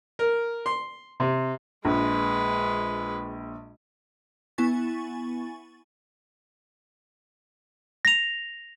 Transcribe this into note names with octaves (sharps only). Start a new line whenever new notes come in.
A#4
C6
C3
A#1 G#3 B4
B3 E4 G#5 C#6 A6
A#6 F7